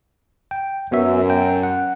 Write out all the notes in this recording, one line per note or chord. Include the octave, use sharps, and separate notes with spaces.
G5
F#2 B3 F#4 E5
G5
F#5